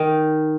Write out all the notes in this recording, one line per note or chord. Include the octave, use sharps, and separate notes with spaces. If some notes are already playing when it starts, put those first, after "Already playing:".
Already playing: D#3